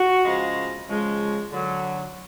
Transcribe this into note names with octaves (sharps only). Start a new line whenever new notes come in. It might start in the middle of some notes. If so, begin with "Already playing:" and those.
Already playing: F#4
C#3 F3 G#3
C#3 F3 G#3
D3 F#3